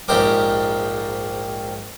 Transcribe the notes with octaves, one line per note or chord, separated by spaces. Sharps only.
A#1 G#2 C4 G4 A#4 D6